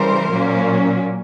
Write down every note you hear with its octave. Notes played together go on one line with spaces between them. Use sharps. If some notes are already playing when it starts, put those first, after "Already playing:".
Already playing: C#3 E3 G3 A#4 C5
A#2 F#3 A#3 C#4